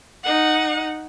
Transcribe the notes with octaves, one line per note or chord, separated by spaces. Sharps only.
D#4 F#5